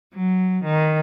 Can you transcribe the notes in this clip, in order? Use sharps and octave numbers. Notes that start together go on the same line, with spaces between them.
F#3
D#3